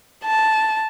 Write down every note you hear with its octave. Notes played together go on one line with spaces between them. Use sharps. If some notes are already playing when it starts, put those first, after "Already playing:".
A5